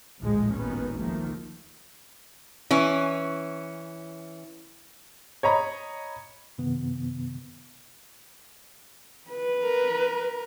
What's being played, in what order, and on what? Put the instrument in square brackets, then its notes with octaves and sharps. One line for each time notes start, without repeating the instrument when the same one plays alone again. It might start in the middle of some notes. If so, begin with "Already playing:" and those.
[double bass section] A#1 D#2 A2 D3 F3 G#3
G#1 D#2 D#3 B3 C#4
C#2 D#3 F3 A3 A#3
[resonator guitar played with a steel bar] E3 C#4
[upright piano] C#5 D#5 A#5 B5
[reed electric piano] F#2 C3 D#3 B3
[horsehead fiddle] B4
[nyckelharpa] A#4